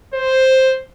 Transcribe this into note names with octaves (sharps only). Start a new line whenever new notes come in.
C5